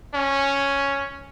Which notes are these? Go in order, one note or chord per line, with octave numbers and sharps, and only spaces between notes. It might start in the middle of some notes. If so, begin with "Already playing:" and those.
C#4